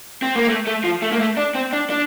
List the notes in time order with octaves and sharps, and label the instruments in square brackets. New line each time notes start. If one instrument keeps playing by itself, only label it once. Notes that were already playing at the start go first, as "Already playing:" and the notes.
[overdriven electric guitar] C4
A#3
A3
A3
F3
A3
A#3
A3
D4
C4
D4
D4